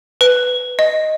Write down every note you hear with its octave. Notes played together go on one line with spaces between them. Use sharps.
B4
D#5